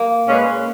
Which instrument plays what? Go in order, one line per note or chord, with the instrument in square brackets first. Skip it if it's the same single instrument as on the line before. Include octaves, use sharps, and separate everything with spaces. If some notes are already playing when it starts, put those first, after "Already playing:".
Already playing: [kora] A#3
[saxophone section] A#2 G#3 C#4 G#4 B4